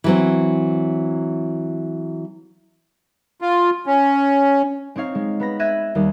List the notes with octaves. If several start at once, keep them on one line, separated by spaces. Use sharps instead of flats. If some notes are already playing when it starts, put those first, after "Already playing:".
E3 F#3 C4
F4
C#4
C4 D#4 C#5 F5
G#3
B3 B5 A#6
E5 F#6 G#6 A#6 D#7
D#2 G3